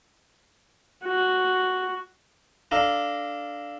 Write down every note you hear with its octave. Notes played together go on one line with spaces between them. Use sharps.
F#4
D4 A4 F5 A#5